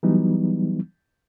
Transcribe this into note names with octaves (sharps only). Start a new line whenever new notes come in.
E3 F#3 G3 B3 D#4